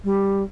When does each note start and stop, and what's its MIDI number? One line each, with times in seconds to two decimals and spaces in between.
0.04 0.43 55